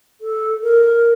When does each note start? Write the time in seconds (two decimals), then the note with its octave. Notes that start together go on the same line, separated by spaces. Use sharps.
0.21 A4
0.63 A#4